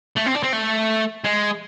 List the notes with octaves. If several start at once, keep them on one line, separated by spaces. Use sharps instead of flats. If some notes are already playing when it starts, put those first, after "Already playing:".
A3
C4
D4
C4
A3
G#3